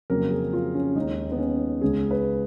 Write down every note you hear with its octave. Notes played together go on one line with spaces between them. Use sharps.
F2 C#3 F#3 A#3 A#4
G#4
F4
C#4
D#2 D#3 G#3 D#4
B3
C#4
C#2 C#3 G#3 G#4
B4